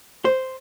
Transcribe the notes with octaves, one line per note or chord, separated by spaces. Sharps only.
C5